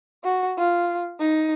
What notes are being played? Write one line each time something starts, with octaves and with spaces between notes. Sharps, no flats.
F#4
F4
D#4